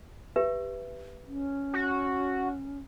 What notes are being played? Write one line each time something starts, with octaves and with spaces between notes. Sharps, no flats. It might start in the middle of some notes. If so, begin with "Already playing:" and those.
G4 B4 E5
C#4
F#4